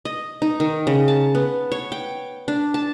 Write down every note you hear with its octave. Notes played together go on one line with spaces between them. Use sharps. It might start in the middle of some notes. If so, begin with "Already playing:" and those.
D#5
D#4
D#3
C#3
A5
B3
C#5
G5
D4
A5